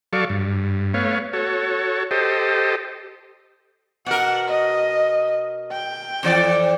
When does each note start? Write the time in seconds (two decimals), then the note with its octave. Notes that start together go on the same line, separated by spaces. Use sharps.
0.13 F#3 A4 D5 F5 C#6
0.29 G2
0.94 A3 B3 C#5 F5
1.33 F#4 A4 C#5
2.11 G4 A4 C5 D#5
4.06 B2 A#4 F#5
4.48 D#5
5.72 G5
6.23 F2 E3 D5